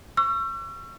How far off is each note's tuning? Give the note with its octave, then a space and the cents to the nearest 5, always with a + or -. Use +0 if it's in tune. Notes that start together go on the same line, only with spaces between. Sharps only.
C#6 +0 E6 +40